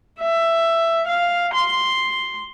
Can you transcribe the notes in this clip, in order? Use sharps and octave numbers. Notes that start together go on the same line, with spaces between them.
E5
F5
C6